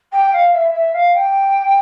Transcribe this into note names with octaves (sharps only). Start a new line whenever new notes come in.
G5
F5
E5
E5
F5
G5